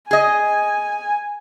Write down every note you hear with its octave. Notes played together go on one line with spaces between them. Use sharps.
G#4 D#5 G#5